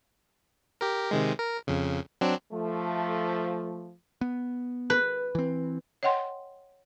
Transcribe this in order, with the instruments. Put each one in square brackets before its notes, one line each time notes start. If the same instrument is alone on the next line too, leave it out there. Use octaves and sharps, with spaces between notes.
[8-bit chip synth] G4 A#4
C3 D#3 G#3
A#4
F2 C#3
F#3 C4 D4
[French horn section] F3 A3
[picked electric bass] B3
[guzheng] B4
[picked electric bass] E3 C4
[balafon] C#5 D#5 F#5 G5 C6